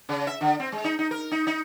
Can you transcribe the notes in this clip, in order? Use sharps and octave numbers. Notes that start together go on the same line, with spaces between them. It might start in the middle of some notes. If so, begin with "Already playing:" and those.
C#3
E5
D3
C4
G#3
D#4
D#4
A#4
D#4
D#4